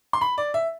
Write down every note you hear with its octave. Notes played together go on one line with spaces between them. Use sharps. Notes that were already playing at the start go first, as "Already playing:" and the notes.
C6
B5
D5
E5